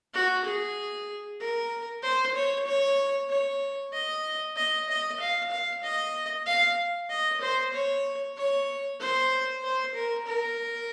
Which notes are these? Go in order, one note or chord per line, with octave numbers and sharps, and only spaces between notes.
F#4
G#4
A#4
C5
C#5
C#5
C#5
D#5
D#5
D#5
F5
F5
D#5
F5
D#5
C5
C#5
C#5
C5
C5
A#4
A#4